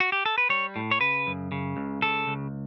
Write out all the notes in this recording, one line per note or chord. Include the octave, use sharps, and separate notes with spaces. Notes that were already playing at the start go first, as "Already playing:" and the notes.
F#4
G4
A4
B4
G3 C#5
A2
C#5
C#3 B4
F#2
C#3
C#2
C#3 A4
C#2